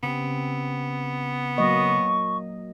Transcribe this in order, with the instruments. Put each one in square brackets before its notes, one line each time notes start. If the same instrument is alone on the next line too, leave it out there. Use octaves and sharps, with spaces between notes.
[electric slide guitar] C#3 C4 G4 [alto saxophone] B3
[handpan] F#3 A#3 D#5 [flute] C#6